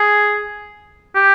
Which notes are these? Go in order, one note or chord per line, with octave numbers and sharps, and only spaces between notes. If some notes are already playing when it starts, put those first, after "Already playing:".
Already playing: G#4
G4